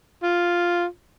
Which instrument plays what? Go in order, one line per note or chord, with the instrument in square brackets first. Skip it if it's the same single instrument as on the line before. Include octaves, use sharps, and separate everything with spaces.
[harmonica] F4